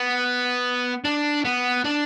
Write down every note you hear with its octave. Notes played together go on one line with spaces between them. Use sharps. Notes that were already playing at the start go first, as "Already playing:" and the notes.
Already playing: B3
D4
B3
D4